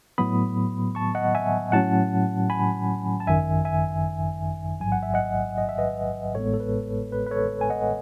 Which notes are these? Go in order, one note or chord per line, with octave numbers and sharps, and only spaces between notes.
A2 F#3 B3 B5 D#6
A5 C#6
D#5 F#5
E5 G#5
A2 F#3 C#4 F#5 A5
G#5 B5
A5
G#1 F#2 D#3 E5 G#5
E5 G#5
A1 G#2 F#3 G#5
F#5
E5
D#5 F#5
D#5
E5
B4 D#5
A1 A2 G#3 B3 A4 C#5
A4
B4
B4
B4
A4 C#5
G#5
D#5 F#5